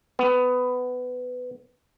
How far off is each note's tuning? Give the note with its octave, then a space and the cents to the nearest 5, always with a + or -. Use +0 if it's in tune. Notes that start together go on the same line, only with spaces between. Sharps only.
B3 +15